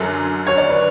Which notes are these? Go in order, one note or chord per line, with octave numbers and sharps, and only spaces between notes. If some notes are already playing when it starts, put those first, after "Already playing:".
Already playing: F#2 D3 F#3 A4
C#5
D5
B4